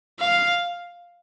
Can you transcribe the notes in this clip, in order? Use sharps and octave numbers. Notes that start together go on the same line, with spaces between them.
F5